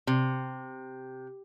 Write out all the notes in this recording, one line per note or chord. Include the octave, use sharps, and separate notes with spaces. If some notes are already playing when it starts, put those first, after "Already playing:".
C3